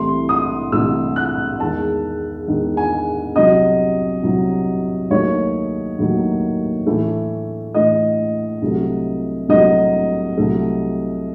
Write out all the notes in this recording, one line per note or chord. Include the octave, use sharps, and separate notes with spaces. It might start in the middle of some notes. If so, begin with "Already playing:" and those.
Already playing: C2 C3 E3 A3 C6
D#6
C2 C3 E3 A3 E6
F#6
E2 D#3 G#3 A5
E2 D#3 G#3
G#5
C2 C3 F#3 D#5
C2 C3 F#3
D#2 D#3 F#3 A3 C#5
D#2 D#3 F#3 A3
A2 E3 A3
A2 E3 A3 D#5
C2 C3 F#3 A3
C2 C3 F#3 A3 D#5
C2 C3 F#3 A3